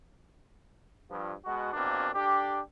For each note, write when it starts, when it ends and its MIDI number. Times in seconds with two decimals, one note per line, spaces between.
1.10 1.32 43
1.10 1.32 53
1.45 1.70 47
1.45 1.70 56
1.45 1.70 66
1.74 2.09 34
1.74 2.09 47
1.74 2.09 58
1.74 2.09 60
1.74 2.09 62
2.15 2.59 50
2.15 2.59 62
2.15 2.59 67